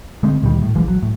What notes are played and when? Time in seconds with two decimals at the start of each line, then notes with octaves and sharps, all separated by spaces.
0.23 D3 G#3 A3 C4
0.42 D2 A#2 D#3 G3
0.62 A2
0.75 A#1 E3 F3 G#3
0.88 F#3
1.02 A2